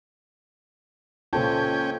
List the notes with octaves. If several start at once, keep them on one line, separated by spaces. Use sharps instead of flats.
C#2 A#2 C#4 F4 A4 C5 G5 A5